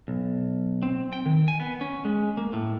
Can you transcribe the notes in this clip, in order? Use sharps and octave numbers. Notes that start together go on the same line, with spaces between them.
B1
C4
G5
D#3
G#5
B3
C#4
G#3
A#3
A2